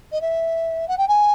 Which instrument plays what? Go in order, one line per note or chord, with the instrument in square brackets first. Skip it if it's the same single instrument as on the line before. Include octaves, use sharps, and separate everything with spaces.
[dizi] D#5
E5
F#5
G5
G#5